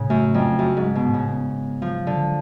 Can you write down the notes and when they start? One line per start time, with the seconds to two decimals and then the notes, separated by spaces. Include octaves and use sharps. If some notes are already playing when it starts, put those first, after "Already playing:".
Already playing: A2 C#3
0.10 F#2 A3
0.34 F2 F#3
0.59 F#2 F#4
0.77 G#2
0.83 G#3
0.95 B2
1.08 A2
1.14 C#3
1.32 B3
1.57 B3
1.82 F3 F#3
2.06 D3 F#3